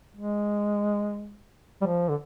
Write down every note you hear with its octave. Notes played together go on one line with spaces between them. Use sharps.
G#3
G3
F3
D3